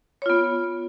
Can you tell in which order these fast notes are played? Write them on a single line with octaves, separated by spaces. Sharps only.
C#5 F4 B3